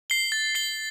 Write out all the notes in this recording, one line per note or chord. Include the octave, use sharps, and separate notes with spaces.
C7 G7
A6
C7 G7